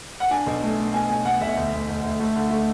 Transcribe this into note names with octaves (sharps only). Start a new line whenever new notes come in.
F#5
D4 G#5
B1
A3
A3
B2 G#5
B1 G#5
B2 F#5
B1 E5
D2
D2
D2
D2
A3
D3
A3